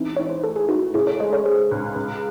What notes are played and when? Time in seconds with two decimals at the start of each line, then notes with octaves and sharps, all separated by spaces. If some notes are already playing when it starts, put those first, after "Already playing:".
Already playing: G#2 E3 C4 D#4
0.17 E3 C#5
0.30 C5
0.43 A3 A4
0.56 G#4
0.69 A3 D#4 F#4
0.94 C#3 E4 G#4
1.07 A4 C#5
1.20 G#3 C5 D#5
1.33 A4 C#5
1.45 G#3 G#4 C5
1.71 C#2
1.96 C#2